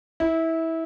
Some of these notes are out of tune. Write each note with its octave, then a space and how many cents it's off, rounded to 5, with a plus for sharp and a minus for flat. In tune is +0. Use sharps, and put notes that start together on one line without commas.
E4 -20